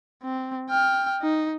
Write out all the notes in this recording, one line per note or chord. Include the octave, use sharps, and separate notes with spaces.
C4
G5 F6
D#4